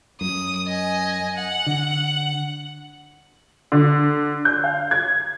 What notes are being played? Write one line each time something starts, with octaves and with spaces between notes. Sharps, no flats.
F#2 D#6
D#5 G#5
F#5
D3
D3
G6
F5
G#6